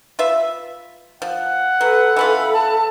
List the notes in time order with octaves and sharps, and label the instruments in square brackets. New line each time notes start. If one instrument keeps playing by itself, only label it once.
[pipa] F4 B4 E5
[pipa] F3 [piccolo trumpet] F#5
[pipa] F#3 [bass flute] A4 [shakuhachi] B4
[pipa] E3 C#4 F4 [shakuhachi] B5
[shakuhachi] A5